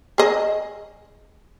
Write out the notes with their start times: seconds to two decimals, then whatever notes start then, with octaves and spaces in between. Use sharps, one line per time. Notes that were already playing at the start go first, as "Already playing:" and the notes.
0.18 G#4 D#5